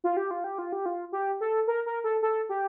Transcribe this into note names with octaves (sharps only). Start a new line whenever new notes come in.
F4
G4
F4
G4
F4
G4
F4
G4
A4
A#4
A#4
A4
A4
G4